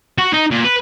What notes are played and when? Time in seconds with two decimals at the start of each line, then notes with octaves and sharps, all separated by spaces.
0.18 F#4
0.33 D#4
0.51 A#2
0.65 B4